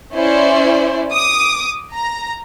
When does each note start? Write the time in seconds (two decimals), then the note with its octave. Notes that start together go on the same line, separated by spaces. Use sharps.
0.14 C#4 E4 C5 D5
1.12 D6 D#6
1.93 A#5